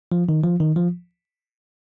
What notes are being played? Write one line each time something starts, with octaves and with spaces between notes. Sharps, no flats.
F3
D#3
F3
D#3
F3